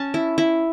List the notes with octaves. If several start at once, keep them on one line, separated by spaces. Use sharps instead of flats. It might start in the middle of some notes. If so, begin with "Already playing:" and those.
Already playing: C#4 A5
E4
E4